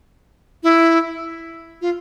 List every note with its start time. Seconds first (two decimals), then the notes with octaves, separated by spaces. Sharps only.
0.63 E4
1.81 F4